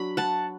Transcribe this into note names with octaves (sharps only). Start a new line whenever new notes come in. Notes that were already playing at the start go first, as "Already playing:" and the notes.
Already playing: F#3 D4 B5
F#5 A5